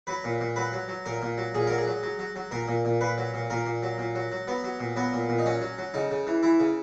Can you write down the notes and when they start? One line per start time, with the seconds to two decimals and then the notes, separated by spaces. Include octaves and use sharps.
0.07 F#3 B4
0.24 A#2
0.41 A#2
0.56 F#3 B4
0.73 F#3
0.89 F#3
1.06 A#2 A#4
1.22 A#2
1.38 F#3
1.55 A#2 G#4
1.67 F#3 A#4
1.78 G#4
1.87 F#3
2.03 F#3
2.19 F#3
2.36 F#3
2.52 A#2 A#4
2.68 A#2
2.85 A#2
3.01 A#2 B4
3.18 F#3
3.34 A#2
3.50 A#2 A#4
3.66 A#2
3.83 F#3
3.98 A#2
4.15 F#3
4.32 F#3
4.47 F#3 B3
4.64 F#3
4.80 A#2
4.96 F#3 B3
5.13 A#2
5.29 A#2
5.38 D#4
5.46 F#3 C#4
5.61 F#3
5.78 F#3
5.94 C#3 D#4
6.11 C#3
6.27 E3
6.43 E3 E4
6.60 C#3